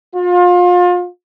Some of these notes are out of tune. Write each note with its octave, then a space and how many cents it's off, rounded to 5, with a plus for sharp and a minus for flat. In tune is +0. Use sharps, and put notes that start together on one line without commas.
F4 +30